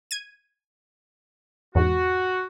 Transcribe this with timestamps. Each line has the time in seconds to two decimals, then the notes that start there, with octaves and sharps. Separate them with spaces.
0.11 G#6 D#7
1.75 E2 G#2 F#4